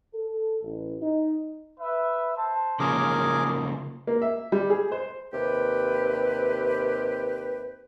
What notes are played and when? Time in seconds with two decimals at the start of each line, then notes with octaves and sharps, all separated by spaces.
0.14 A4
0.63 A1
1.02 D#4
1.79 B4 E5
2.35 C5 A5
2.80 C#3 F3 A#3 C#4 G#4 A#4 D6
4.07 A#3
4.22 E5
4.52 G3
4.70 G#4
4.92 C5
5.33 D#2 C3 G4 B4